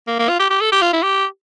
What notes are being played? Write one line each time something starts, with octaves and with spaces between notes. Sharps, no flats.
A#3
A#3
F4
G4
G4
A4
G4
F4
E4
G4